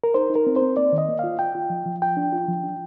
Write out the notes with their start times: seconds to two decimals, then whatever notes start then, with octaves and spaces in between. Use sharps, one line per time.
0.04 A#4
0.14 D#4 C5
0.30 D#4
0.36 A#4
0.47 C4
0.56 C5
0.62 C4
0.77 A#3 D5
0.93 D#3
0.98 D#5
1.09 A#3
1.19 F4 F5
1.39 F4 G5
1.55 F4
1.70 F3
1.86 F3
2.02 F4 G5
2.17 D4
2.32 F4
2.48 F3
2.64 D4